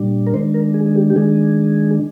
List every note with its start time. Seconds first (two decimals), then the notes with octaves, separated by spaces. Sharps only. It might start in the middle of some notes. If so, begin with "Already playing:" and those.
Already playing: A#2 G3 D4
0.27 A#4
0.34 D#3 G#3 D4 C5
0.54 A#4
0.74 G#4
0.86 G#4
0.96 G4
1.10 G4
1.16 D#3 G#3 D4 G#4